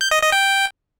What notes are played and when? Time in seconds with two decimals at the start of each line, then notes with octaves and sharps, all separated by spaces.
0.01 G6
0.11 D#5
0.22 D#5
0.32 G5